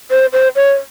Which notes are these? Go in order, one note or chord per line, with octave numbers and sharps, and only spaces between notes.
C5
C5
C#5